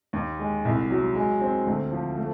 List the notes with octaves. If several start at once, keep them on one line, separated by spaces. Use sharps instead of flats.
D#2
G#3
C2
F#3
G#3
C4
D2
F3
A3